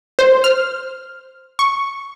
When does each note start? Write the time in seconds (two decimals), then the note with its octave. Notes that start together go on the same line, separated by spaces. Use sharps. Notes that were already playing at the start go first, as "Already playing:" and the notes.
0.19 C5
0.44 F6
1.59 C#6